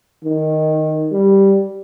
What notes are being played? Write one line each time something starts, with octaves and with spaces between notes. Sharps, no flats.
D#3
G3